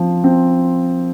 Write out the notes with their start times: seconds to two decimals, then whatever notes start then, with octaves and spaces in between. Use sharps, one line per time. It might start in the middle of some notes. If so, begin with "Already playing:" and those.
Already playing: F3 C4
0.24 C4